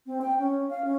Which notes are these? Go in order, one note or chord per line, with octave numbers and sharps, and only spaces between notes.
C4
G5
C#4
F5
C#4